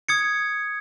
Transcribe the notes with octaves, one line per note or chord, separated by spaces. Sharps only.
D#6 G#6 C#7